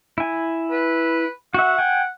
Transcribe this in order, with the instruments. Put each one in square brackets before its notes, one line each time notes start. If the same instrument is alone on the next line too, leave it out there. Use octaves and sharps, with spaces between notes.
[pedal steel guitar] E4 G#5
[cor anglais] B4
[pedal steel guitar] F#4 E5 [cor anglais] F#5
[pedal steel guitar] G5 G#5